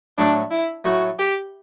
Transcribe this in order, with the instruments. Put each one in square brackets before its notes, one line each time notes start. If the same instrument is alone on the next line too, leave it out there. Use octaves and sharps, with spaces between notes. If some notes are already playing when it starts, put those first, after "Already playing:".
[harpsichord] A2 F#3 A3 [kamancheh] D4
[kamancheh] E4
[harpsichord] A2 F#3 A3 [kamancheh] F#4
[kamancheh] G4